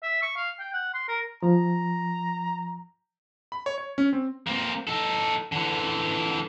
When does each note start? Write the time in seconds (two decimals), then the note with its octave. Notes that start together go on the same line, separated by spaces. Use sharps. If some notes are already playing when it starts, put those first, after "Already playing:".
0.03 E5
0.22 C#6
0.37 F5
0.59 G5
0.73 F#5
0.94 C6
1.08 A#4
1.43 F3 A#5
3.52 B5
3.66 C#5
3.78 C#5
3.98 C#4
4.13 C4
4.47 A#3 C4
4.88 D#4 A4
5.52 D3 E3